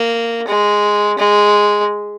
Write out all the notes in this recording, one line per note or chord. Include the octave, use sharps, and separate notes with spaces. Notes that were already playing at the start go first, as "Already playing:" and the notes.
Already playing: A#3
G#3
G#3